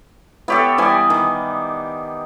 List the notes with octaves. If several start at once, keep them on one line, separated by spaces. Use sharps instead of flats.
B3 E4 G4 A4 C#5 E5
E3 G3 G#5 D6 D#6
D#3